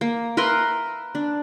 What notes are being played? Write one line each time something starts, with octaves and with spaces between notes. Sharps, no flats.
A#3
A#4 B4 E5 C6
D4